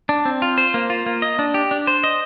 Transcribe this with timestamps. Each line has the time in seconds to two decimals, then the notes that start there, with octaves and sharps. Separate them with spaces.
0.09 D4
0.25 C4
0.42 F4
0.58 C5
0.74 A#3
0.90 F4
1.06 A#3
1.22 D#5
1.39 D4
1.54 G4
1.71 D4
1.87 C5
2.04 D#5